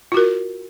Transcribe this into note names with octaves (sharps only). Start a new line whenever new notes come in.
F4 F#4 A#4